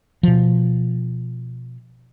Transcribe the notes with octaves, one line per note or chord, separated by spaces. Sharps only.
B2 F3